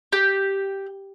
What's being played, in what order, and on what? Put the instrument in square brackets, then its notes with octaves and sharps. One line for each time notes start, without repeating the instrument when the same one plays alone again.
[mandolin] G4